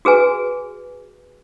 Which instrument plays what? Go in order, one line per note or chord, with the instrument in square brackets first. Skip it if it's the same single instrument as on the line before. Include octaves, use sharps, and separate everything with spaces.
[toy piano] F#4 G#4 B4 G#5